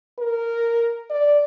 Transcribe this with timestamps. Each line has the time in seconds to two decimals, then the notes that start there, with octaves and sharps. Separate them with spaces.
0.18 A#4
1.10 D5